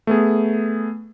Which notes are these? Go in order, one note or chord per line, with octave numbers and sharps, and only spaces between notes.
A3 B3 G#4